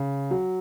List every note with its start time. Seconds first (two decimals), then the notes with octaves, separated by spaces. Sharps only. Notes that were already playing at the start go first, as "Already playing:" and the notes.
Already playing: C#3
0.31 F#3